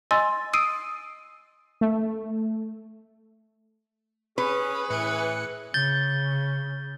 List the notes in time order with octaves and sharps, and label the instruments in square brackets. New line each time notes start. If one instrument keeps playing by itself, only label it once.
[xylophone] D#5 G#5 C6 E6 A6
D#6 E6 C7 D7 D#7
[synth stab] A3
[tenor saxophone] C#4 [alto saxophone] G#4 [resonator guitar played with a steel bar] B4
[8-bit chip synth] A2 F#6 C#7 [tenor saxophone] E3
[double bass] C#3 [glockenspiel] G6 A6 G7